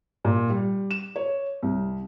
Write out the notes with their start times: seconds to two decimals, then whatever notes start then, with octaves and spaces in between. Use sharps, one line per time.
0.25 A#2
0.50 G3
0.91 E7
1.16 C#5
1.62 C2